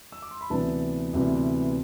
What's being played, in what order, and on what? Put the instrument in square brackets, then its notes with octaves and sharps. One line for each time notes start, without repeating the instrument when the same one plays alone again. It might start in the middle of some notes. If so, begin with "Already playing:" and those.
[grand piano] E6
D6
C6
B5
D2 C3 E3 B3 D4 A5
D2 C3 E3 B3 D4